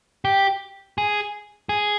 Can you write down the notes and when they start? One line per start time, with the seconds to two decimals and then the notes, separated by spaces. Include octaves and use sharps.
0.25 G4
0.98 G#4
1.69 G#4